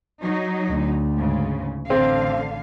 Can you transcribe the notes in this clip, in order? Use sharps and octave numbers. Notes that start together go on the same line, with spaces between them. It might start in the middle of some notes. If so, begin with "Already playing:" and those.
F#3 D#4
D2
G#2 C#3
A1 D3 C4 F5